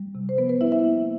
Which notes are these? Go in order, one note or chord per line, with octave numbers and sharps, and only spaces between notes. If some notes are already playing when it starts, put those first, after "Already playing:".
Already playing: G3
C3
C5
F3 B3 B4
B3 B4
C#4 E4 E5
E4 E5
A#3